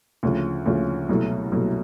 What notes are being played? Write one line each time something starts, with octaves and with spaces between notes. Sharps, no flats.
D2 C#3 F3
D2 C#3 F3
C2 B2 F#3 A3
C2 B2 F#3 A3